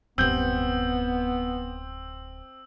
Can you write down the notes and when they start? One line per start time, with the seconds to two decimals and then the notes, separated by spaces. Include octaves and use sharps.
0.18 D1 G2 B3 C4 E6 G6